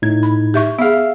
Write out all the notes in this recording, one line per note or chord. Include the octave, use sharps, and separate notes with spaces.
A2 D#4 G#6
B5
G4 E5 C#6
B3 G#4 E5 F5